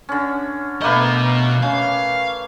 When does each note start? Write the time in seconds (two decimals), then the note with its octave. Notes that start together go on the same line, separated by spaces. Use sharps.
0.09 D3 C#4
0.81 B2 A3 A#3 B4 D#5
1.63 C#4 F5